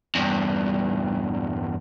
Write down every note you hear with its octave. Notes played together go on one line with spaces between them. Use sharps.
E2 G2